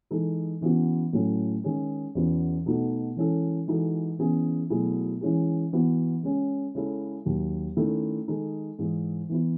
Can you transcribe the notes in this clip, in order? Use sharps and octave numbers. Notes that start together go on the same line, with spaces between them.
E3 G#3 D#4 A4
C#3 E3 B3 F#4
A2 F#3 C#4 E4 A4
D#3 G#3 C#4 G#4
E2 C#3 E3 B3 F#4
B2 A3 D#4 F#4 A4
E3 G#3 C#4 E4 A4
E3 G#3 D#4 F#4 A4
C#3 E3 B3 E4 G#4
B2 F#3 A3 E4 G#4
E3 G#3 C#4 E4 G#4
E3 B3 F#4
C#3 G#3 C#4
C#3 G#3 C#4 E4 A4
D#2 D#3 F#3
D#3 A3 C#4 E4 A4
D#3 G#3 D#4 A4
G#2 E3 G#3
E3 B3 E4